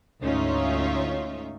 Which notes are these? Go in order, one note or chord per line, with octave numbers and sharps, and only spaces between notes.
D2 G#2 C#4 D#4 F4 E5